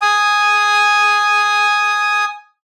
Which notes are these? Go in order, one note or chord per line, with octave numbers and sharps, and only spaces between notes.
G#5 D#6